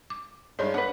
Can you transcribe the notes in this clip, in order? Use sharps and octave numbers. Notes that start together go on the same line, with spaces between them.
D6
G2 G#3 D#4 C5 C#5
D4 B4 F#5 B5